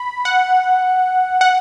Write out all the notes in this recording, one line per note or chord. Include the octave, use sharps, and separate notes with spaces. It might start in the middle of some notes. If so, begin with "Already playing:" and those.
Already playing: B5
F#5
F#5